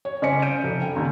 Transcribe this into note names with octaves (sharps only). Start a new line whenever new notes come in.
C#5
C#3 C5 D5 G#5 B6 C#7
F5 G6 D7 D#7
F1
G5
D#2 C#3 A#5